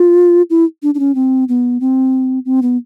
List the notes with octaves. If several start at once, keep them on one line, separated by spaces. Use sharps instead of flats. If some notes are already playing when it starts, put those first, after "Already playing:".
Already playing: F4
E4
D4
D4
C#4
C4
B3
C4
C4
B3